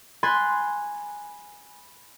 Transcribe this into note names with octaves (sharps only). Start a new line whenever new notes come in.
G#5 B5 C6 F#6 G#6 A6